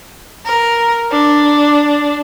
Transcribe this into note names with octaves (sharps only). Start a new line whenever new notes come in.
A#4
D4